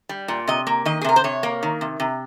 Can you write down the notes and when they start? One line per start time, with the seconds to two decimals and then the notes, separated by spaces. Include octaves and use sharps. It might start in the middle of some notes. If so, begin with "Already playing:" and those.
0.09 G3
0.28 A#2
0.47 C3 D#5
0.67 A#3
0.85 D#3 D#5
1.01 G#4
1.04 C3 A#4
1.16 C5
1.24 C3 C#5
1.43 A#3
1.63 D#3
1.81 C3
2.00 C3